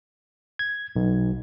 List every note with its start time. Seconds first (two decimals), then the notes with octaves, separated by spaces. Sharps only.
0.59 G#6
0.96 B1